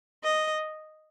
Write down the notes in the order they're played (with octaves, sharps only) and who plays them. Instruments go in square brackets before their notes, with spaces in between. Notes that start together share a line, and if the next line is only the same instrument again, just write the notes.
[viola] D#5